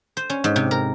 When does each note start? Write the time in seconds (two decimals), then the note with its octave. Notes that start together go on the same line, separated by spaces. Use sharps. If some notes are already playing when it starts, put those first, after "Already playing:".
0.17 C5
0.30 C#4
0.44 G#2
0.56 C3
0.71 A#4